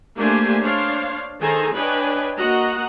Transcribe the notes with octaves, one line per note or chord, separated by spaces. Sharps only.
A3 A#3 D4 G4 C5 G#5
D4 C5 C#5 F5 C6
D#3 G#4 A4 C5 G#5 A#5
D4 B4 C#5 D#5 G5 G#5
A#3 F#4 D#5 F#5 A#5